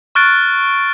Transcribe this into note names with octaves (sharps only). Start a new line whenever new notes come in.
C#6 F6 F#6 A6 D7